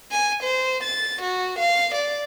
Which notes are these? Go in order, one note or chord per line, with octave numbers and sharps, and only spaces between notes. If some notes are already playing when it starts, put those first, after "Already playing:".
G#5
C5
A6
F#4
F5
D5